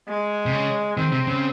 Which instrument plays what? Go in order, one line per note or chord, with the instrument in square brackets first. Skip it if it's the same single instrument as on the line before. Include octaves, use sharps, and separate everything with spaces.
[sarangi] G#3
[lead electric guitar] C3
C#3
[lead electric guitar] D#3 [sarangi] C4
[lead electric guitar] C3
C#3